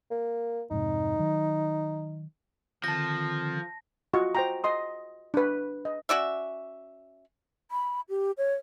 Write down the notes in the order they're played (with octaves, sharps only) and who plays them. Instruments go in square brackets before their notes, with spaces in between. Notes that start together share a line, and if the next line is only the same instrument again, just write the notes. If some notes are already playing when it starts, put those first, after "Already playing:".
[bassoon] A#3
[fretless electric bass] F2 G#2 C3 [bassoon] D#4
[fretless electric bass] D#3 F#3
[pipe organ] D3 D#3 C4 [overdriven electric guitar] F3 [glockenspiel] A5 A#6
[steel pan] F4 F#4 D#5 F#5 C#6
C5 G5 A#5
D#5 C6 D#6
D4 B4
D#5
[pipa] C#4 F#4 D5 E5
[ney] B5
G4
C#5